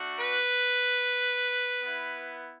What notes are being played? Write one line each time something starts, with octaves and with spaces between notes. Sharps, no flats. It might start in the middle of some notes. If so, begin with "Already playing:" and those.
Already playing: A3 D4 F#4
B4
B3 E4